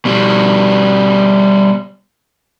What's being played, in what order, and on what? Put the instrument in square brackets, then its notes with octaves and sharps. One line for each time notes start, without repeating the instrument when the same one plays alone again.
[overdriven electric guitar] B2 G3